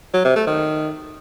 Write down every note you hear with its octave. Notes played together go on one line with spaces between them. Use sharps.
F#3
C3
A3
D#3